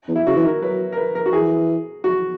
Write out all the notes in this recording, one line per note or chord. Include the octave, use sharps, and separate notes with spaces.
E2
E4
C#3 F#4
E3
D#3 A#4
F#3 B4
A#4
B4
A#4
F#4
E3 G#4
F#4